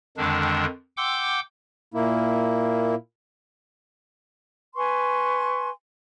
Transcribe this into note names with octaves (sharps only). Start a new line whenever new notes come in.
F2 D3 D#3 G#3 D4
F#5 G5 C6 D6 E6 G6
A#2 A#3 E4
B4 G#5 C6 C#6